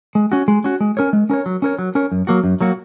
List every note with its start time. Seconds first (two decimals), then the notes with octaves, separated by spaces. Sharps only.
0.15 G#3
0.32 C#4 F#4
0.48 G#3
0.64 C#4 F#4
0.81 G#3
0.97 C#4 A#4 C#5
1.13 G#3
1.30 C#4 A#4 C#5
1.46 F#3
1.62 C#4 A#4 C#5
1.79 F#3
1.95 C#4 A#4 C#5
2.12 F#2
2.27 F#3 A#3 F#4
2.44 F#2
2.60 F#3 A#3 F#4